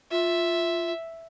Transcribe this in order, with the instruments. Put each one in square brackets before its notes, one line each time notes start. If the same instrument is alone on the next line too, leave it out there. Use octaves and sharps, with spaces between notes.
[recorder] F4 [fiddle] E5